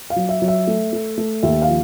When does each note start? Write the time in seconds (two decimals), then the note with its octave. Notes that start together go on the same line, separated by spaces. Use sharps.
0.10 F5
0.16 F#3
0.29 E5
0.42 F#3
0.48 E5
0.67 A3
0.93 A3
1.18 A3
1.43 D#2 E5
1.62 F5
1.68 F3